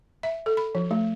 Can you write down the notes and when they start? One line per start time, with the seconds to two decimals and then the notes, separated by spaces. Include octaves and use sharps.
0.23 E5
0.46 A4
0.57 B5
0.75 F3
0.91 A3